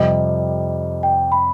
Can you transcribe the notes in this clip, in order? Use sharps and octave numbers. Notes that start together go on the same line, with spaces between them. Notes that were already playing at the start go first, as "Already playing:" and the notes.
Already playing: F2 C3 G3 D#5
G5
B5